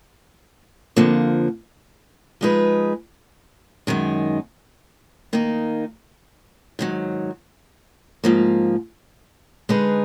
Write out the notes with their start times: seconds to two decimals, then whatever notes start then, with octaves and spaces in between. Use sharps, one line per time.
0.96 F2 D3 F3 A#3
2.41 F3 G#3 D#4 G#4 B4
3.87 F#2 D#3 G#3 D#4
5.33 D#3 A#3 D#4
6.79 G#2 D#3 F#3
8.24 G#2 F3 A#3
9.69 D3 G#3 D#4 G#4 B4